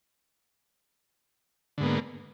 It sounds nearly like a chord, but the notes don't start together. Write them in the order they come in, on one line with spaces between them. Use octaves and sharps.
D3 G#2 B3 A#3